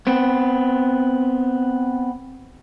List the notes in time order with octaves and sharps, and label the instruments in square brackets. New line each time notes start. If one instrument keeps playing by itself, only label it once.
[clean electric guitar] B3 C4